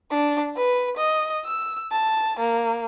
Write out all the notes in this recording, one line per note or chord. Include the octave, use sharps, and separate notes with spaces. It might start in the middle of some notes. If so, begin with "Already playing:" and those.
D4
B4
D#5
E6
A5
A#3